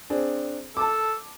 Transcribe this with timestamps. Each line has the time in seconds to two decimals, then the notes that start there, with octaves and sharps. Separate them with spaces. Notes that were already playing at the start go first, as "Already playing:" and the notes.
0.10 C4 D4 G#4
0.77 A4 A5 D6